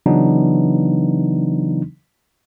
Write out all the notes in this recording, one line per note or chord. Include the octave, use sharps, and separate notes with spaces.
C#3 E3 F#3 B3 D4 D#4